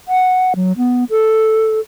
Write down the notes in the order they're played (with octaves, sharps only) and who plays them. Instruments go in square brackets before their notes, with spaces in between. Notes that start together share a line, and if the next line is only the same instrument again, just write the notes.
[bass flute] F#5
F#3
B3
A4